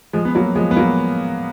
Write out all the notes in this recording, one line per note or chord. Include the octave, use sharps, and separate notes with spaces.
F3 G#3
B3
F#3 A#3
F3 G#3
B3
F#3 A#3